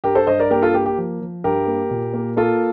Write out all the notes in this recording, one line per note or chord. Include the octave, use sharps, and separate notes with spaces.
G2 G4 A#4
A4 C5
G2 C5 D#5
A#4 D5
A#3 G4 A#4
F4 A4
A#3 G4
G4
F3
F3
G2 G4 A#4
A#3
A#2
A#3
A#3 F4 A4